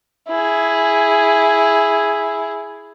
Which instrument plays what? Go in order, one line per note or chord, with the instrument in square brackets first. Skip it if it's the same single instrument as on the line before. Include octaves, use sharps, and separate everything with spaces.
[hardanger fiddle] E4 G#4